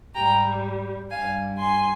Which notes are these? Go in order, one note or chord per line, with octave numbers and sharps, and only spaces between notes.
G#2 G3 G5 A#5
G2 G3 F5 G#5
G#5 C6